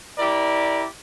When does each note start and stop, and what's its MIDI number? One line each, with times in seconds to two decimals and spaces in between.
0.19 0.84 64
0.19 0.84 67
0.19 0.84 70
0.19 0.84 74